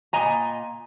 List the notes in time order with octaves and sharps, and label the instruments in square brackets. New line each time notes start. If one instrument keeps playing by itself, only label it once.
[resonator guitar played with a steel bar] A#2 D#5 G#5 A#5